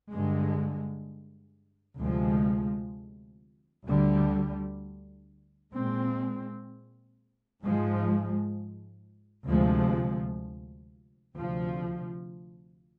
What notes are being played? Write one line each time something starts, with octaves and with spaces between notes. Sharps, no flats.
G2 D3 G#3
D2 C3 F3 G#3
D2 D3 G3
A#2 G#3 C4
G#2 F3 G#3
D2 C3 F3 G#3
D2 C3 F3